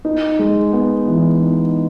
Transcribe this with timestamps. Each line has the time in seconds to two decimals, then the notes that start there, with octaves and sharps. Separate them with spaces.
0.05 D#4
0.39 G#3
0.73 B3
1.08 E3
1.42 D#4